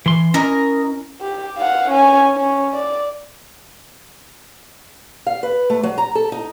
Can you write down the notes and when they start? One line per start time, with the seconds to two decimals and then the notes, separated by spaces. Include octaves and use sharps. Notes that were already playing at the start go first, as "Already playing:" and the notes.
0.06 E3 C6
0.34 C#4 E4 A#4 D#5
1.21 G4
1.57 F5 F#5
1.90 C#4 G#5
2.37 C#4
2.73 D5
5.27 F5
5.43 B4
5.70 A3
5.83 F#3
5.98 A#5
6.15 A4
6.32 D#4